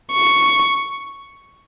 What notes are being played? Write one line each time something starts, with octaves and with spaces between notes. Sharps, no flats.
C#6